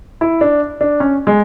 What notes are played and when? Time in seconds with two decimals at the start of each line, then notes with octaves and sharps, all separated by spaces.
0.21 E4
0.41 D4
0.81 D4
1.00 C#4
1.27 G#3